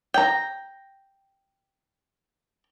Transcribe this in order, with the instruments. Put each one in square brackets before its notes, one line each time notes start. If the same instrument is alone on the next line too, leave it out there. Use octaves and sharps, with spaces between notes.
[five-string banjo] G5 A#5